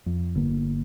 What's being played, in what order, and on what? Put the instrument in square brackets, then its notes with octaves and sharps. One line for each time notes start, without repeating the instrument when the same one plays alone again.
[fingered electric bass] F2
G1 D3 A#3